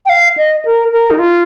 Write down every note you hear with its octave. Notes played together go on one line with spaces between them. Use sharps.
G5
F5
D#5
A#4
A#4
D#4
F4